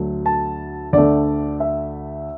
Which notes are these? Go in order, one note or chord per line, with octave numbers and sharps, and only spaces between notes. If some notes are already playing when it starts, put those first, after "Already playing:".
Already playing: D2 D3 F#3 A3
A5
D2 D3 A3 D5
E5